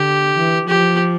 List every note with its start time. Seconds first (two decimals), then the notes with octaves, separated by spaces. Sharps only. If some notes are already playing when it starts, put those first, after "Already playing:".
Already playing: D3 G4
0.36 E3
0.68 F3 G4